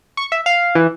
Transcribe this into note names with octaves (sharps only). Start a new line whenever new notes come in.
C#6
E5
F5
E3